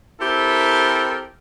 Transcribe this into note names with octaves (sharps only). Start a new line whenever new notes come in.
C4 E4 G4 A4 A#4